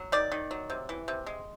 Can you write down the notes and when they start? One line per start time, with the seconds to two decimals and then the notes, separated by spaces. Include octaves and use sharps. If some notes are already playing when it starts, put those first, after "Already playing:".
Already playing: F#3
0.12 D#3 D5
0.32 D#3
0.51 F#3
0.70 C3
0.89 E3
1.08 C3
1.27 G#3